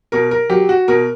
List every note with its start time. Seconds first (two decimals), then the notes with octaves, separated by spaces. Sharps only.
0.12 B2 A#4
0.31 A#4
0.50 F#3 G4
0.69 F#4
0.88 B2 A#4